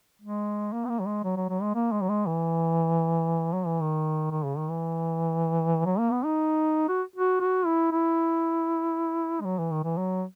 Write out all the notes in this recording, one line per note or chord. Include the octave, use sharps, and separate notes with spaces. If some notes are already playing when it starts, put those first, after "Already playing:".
G#3
A#3
B3
A#3
F#3
G#3
F#3
F#3
F#3
G#3
A#3
G#3
F#3
G#3
E3
F#3
E3
D#3
D#3
C#3
D#3
E3
F#3
A#3
B3
D#4
F#4
F#4
F#4
E4
E4
G#3
F#3
E3
D#3
E3
F#3